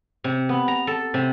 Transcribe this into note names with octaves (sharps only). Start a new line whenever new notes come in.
C3
B3
A#5
A4
C3